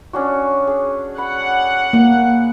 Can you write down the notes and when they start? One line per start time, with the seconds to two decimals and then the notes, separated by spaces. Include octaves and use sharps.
0.13 C#4 D4 F#4
0.67 G#4
1.18 F#5 B5
1.93 A#3